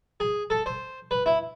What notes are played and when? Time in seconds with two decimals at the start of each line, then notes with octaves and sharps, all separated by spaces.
0.20 G#4
0.50 A4
0.66 C5
1.11 B4
1.26 E4